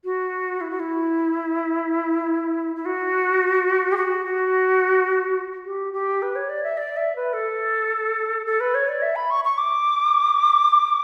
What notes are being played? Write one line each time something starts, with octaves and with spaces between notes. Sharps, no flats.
F#4
E4
F#4
E4
E4
F#4
G4
F#4
F#4
G4
G4
B4
C#5
D5
E5
D5
E5
B4
A4
A4
B4
C#5
D5
E5
B5
C#6
C#6
D6